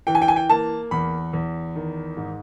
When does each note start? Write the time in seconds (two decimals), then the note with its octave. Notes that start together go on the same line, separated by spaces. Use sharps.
0.07 E3 G5
0.15 G#5
0.22 G5
0.28 G#5
0.36 G5
0.50 A#3 A5
0.91 E2 B5
1.33 E2
1.76 D#3
2.17 G#2